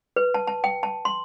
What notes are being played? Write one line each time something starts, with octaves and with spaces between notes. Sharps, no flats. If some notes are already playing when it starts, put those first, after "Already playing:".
B4
A5
A5
G5
A5
C6